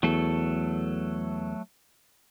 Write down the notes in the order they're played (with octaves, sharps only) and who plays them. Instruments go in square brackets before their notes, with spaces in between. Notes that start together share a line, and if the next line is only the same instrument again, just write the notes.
[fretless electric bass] E2 [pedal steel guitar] F#3 A3 A4